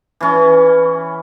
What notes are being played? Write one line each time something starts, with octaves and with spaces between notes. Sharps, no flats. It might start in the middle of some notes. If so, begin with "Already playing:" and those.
E3 C#4